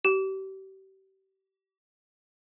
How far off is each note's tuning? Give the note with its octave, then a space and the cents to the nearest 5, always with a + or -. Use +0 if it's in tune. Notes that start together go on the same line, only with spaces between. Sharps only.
G4 -35